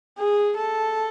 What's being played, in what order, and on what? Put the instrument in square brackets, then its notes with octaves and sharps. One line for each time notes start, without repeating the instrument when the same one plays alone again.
[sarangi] G#4
A4